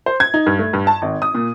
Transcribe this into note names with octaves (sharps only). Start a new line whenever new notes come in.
C5
G#6
D#4
G2
A3
G2
A5
G#1
D#6
A#2